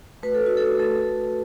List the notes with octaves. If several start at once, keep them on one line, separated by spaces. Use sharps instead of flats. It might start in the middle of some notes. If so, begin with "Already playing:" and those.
A3 F#4 B4
A4
F#4
A4
A3 F#4 A4